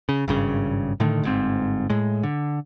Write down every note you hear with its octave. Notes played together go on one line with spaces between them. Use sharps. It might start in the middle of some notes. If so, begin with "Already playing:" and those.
C#3
G#1 G2 C#3
A2 D3 D#3 A3
G1 G#2 C4
A2 G#3
D3